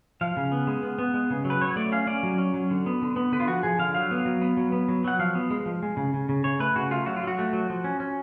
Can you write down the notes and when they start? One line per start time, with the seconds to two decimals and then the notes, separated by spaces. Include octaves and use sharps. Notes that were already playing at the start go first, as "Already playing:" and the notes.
0.21 F3 F5
0.37 C#3
0.52 B3
0.67 G#3
0.83 B3
0.99 B3
1.14 G#3
1.30 C#3
1.45 F#3
1.50 B4
1.61 F#3 C#5
1.76 A3 D5
1.92 C#4 F5
2.07 C#4 D5
2.23 F#3
2.38 C#4
2.54 F#3
2.71 D3
2.86 B3
3.02 D3
3.16 B3
3.32 D3 B4
3.40 F4
3.47 F3 F#4
3.63 F3 G#4
3.79 D3 F5
3.95 F#3 F5
4.11 B3
4.25 F#3
4.41 B3
4.57 F#3
4.72 B3
4.89 F#3
5.04 F#3 F#5
5.19 F3 F5
5.35 B3
5.50 G#3
5.66 F3
5.83 G#3
5.97 C#3
6.14 C#3
6.29 C#3
6.44 C#3 C#5
6.59 A3 B4
6.76 C#3 F#4
6.91 A3 F4
7.06 F#3 F#4
7.16 F4
7.23 F#3 F#4
7.38 A3
7.53 F#3
7.70 F3
7.84 C#4
8.00 C#4